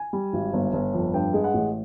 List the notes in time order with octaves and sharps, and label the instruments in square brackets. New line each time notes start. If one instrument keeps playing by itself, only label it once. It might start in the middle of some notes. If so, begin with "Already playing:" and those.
Already playing: [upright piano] G#5
G3
G#1
G1
G1
F2
G2 G5
G#3
F#5
A1